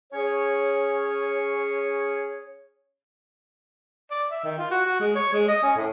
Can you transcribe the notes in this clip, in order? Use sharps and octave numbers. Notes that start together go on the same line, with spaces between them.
C#4 G#4 C#5
D5
E5
D#3
F4
F#4
F#4
G#3
C#5
G#3
D#5
C#4
A2